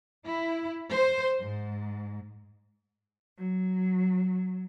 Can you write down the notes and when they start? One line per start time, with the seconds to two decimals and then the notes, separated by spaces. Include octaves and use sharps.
0.25 E4
0.94 C5
1.41 G#2
3.38 F#3